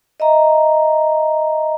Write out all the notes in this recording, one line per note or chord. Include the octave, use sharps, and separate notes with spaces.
D#5 E5 A#5